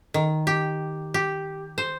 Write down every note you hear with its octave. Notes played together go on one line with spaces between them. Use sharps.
D#3
G4
G4
C5